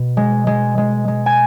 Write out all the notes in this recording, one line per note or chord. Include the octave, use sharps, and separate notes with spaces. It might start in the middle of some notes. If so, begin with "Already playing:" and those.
Already playing: B2
G#3
G#3
G#3
G#3
G#5